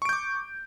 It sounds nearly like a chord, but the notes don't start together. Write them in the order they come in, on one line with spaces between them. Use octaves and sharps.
C#6 D7 G6 D6